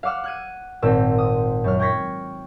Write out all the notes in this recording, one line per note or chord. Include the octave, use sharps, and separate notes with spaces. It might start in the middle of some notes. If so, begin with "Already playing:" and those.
F5 F#5 D6 E6 F6
F#6 G#6 D#7
G#1 A#2 C4 E6
D#6
F#2 F6
G5 C#6 G#6 A#6 B6